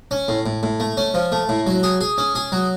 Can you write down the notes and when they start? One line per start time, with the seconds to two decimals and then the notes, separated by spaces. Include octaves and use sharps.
0.11 C#4
0.28 A2
0.46 A2
0.63 A2
0.80 A3
0.97 C#4
1.14 F3
1.32 A3
1.49 A2
1.67 F#3
1.83 G#4
2.01 G#4
2.18 C#4
2.35 G#4
2.52 F#3